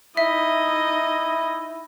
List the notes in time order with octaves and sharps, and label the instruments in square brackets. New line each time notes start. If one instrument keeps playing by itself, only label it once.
[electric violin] D#4 D#5 [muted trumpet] E4 [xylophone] E5